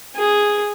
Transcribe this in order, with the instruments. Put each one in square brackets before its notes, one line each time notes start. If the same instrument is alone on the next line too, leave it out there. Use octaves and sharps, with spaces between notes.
[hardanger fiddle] G#4